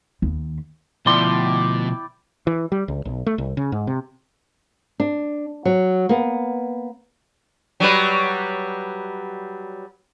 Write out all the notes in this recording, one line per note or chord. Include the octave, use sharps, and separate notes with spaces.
D#2
D2 B2 F3 E4 D5 G5 C6
E3
G3
C#2
B1
A3
C2
C#3
G#2
C3
D4
F#3
A#3 B3
F#3 G3 B4